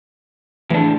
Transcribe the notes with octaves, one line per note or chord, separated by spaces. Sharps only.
A2 C#3 E3 D4